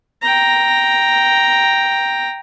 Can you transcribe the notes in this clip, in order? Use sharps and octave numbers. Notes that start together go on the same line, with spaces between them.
G5 A#5